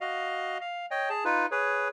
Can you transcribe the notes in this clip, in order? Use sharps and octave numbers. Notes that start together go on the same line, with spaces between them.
F#4 D#5 F5
F5
C#5 D#5 G5
G#4 A5
D#4 F4 B4
G#4 B4 C#5